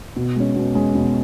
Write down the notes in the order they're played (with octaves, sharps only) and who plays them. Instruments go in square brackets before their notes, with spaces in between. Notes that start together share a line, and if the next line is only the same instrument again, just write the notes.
[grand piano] B2
G#3 C#4
B2
G#3 C#4
B2